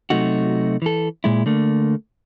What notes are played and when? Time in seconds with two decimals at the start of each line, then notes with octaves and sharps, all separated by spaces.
0.10 C3 F#3 A3 D#4 F#4
0.82 E3 A4
1.24 A#2 G#3 E4
1.46 D3 A3 A#3